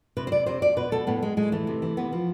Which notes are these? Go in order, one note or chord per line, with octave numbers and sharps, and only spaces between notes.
C3 B4
C5
C3 D5
C3 C5
B2 D5
B2 B4
B2 A4
A2 B3
A2 G#3
A2 G#3
E3 A3
C3
E3
C3 B3
F3